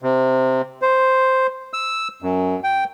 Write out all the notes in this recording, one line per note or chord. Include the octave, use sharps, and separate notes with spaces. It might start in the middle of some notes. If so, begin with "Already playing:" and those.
C3
C5
E6
F#2
G5